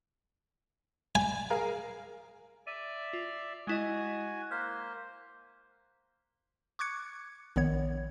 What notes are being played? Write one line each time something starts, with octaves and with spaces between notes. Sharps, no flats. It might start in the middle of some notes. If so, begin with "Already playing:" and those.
G#5
G#4 A#4 F5
D5 E5 D#7
F4
G#3 E4 F#4 D#5 G#5
A#3 C5 F6 F#6 B6
C#6 D6 F#6 G#6 C#7
A#1 D#3 B3 C#5 G#6